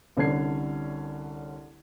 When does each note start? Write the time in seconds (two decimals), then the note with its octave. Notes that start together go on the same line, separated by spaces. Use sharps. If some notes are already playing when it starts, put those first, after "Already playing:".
0.17 C2 D3 C#4 D4 G#6 C7